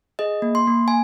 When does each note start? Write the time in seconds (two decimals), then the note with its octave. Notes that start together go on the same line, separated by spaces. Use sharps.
0.19 G#4 D#5
0.42 A#3
0.55 C6
0.67 A#3
0.88 G#5